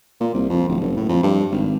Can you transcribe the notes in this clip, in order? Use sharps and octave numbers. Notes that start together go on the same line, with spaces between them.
A#2
C2
F2
D1
F#1
A2
F2
G2
G#1